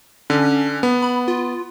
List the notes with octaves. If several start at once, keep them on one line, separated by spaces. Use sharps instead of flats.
D3 C#4
B3
B5
F4